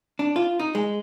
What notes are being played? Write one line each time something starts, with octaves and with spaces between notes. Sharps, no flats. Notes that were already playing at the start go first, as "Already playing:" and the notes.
D4
F4
D#4
G#3